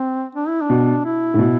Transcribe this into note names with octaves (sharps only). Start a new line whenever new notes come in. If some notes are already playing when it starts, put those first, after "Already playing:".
Already playing: C4
D4
E4
D4
B2
E4
A2
B2